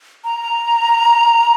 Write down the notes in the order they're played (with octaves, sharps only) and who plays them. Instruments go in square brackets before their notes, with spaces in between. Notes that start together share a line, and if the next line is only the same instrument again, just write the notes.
[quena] A#5